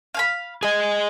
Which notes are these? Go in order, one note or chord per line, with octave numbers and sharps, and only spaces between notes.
F5 G#5 B5
G#4 D#5 G#5